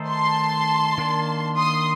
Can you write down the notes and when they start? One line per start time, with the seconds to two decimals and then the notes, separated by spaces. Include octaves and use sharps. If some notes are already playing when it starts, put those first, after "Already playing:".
Already playing: D#3 A3 D#4 A4 C5
0.08 A5 C6
0.98 D#3 A#3 D4
1.57 C6 D#6